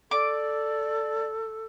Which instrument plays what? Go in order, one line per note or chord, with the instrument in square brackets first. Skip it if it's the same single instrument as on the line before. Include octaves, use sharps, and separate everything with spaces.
[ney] A4 [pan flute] D5 [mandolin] D6